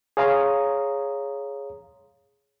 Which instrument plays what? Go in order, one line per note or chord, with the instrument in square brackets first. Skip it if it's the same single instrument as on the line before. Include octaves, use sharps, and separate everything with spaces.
[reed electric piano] G#4 C#5 F5 A#5 C6 D#6